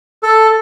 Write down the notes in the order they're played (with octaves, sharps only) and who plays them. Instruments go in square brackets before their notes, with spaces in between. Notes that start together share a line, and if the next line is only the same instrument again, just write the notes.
[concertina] A4